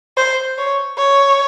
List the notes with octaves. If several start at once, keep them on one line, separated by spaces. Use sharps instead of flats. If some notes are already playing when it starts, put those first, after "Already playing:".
C5
C#5
C#5